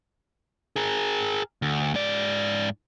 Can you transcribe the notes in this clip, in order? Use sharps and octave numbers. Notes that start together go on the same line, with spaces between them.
G#4 A#4
D2
G#2 D5